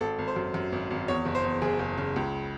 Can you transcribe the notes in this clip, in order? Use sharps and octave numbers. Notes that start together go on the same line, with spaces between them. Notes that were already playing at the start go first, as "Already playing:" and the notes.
G#1 A4
G#1
C5
F#2
F#2
G#1
G#1
E2 C#5
F#1
C5
E2
F#1 G#4
F#1
C#3
C#2